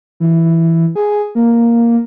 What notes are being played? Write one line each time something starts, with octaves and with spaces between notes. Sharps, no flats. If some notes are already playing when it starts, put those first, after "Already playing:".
E3
G#4
A#3